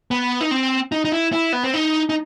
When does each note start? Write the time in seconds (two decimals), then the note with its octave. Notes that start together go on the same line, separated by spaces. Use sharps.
0.11 B3
0.41 D#4
0.51 C4
0.92 D#4
1.05 D#4
1.12 E4
1.33 E4
1.53 B3
1.64 C4
1.74 D#4
2.09 D#4